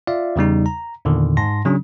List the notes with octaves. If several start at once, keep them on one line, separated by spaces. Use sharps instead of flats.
F4 D5 E5 F5
E2 C#3 G3 D#4
A#5
E2 A#2 D3 D#3
G#2 A5 C6 A#6
C#3 F#3 C#4 D4